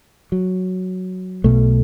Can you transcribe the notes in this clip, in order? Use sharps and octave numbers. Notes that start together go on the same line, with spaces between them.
F#3
B1 B2 A3